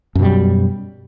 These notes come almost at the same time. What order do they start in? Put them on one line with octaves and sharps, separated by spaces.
F#2 B2 G3 F#3